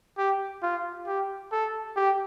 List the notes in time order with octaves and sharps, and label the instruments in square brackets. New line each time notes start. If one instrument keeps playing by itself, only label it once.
[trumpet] G4
F4
G4
A4
G4